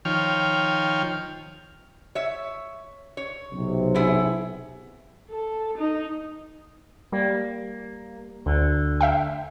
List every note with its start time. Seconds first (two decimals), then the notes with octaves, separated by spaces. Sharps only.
0.05 D#3 F3 C#5 G5 F6
2.15 C#5 E5
3.17 C#5
3.52 B1 C3
3.94 B3 E4 G#4
5.30 A4
5.78 D#4
7.12 G3 A#3
8.46 D2 D3
9.01 E5 F5 G5